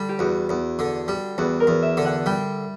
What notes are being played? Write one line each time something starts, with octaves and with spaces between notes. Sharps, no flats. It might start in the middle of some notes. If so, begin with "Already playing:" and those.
Already playing: D3 G3
G4
E2 F#4
E2
D3
G3
E2 F#4
A#4
E2
E5
D3
F#5
G3 G5